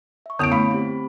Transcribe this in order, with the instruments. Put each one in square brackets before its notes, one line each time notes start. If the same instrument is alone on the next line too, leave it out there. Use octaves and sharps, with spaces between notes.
[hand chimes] E5 C#6
[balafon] D3 B3 A5 [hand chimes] E4 C#5 [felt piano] D#6 D7
[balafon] A3 B3 [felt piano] B5
[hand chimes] C4 G4